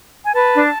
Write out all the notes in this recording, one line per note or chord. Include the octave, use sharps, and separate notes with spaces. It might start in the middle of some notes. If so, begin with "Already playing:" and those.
G#5
B4 A5
D4